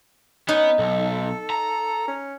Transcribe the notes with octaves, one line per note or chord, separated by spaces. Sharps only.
B3 C#4 D#4
B1 A4
A#5
C#4